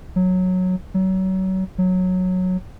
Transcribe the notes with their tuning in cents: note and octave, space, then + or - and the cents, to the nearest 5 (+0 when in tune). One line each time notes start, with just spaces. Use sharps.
F#3 -10
F#3 +30
F#3 -10